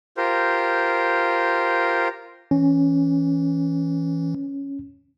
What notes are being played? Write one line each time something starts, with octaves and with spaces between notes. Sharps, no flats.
F4 G4 A#4 C5
E3 C#4